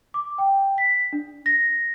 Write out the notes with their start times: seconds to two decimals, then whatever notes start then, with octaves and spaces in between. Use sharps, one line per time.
0.14 D6
0.38 G5
0.78 B6
1.13 D4
1.46 A#6